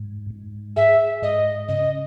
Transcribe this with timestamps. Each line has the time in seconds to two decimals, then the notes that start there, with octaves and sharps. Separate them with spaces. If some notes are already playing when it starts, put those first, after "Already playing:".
Already playing: G#2
0.30 G#2
0.76 G#4 E5
1.22 G#2 D#5
1.68 C#3 D#5